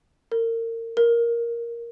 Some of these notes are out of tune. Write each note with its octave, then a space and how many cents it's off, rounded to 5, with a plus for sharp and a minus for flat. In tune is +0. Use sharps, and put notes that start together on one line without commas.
A#4 -30
A#4 +5